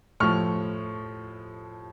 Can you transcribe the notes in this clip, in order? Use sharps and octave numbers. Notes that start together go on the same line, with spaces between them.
A2 F3 C#6 F6